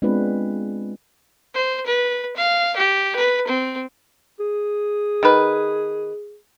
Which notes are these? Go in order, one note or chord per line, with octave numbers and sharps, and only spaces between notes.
G#3 B3 C4 D4 F4 B4
C5
B4
F5
G4
B4
C4
G#4
D#3 B4